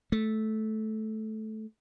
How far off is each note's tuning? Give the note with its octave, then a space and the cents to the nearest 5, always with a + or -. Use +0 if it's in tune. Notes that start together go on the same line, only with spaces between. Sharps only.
A3 -15